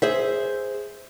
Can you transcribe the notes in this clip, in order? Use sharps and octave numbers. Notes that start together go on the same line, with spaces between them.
G#4 C5 E5